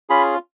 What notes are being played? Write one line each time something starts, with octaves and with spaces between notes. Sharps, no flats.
C#4 F4 G#4 B5